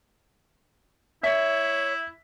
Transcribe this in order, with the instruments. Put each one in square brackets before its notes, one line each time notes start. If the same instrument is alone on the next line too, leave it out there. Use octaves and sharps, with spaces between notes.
[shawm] E4 [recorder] C#5 [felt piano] E5 B6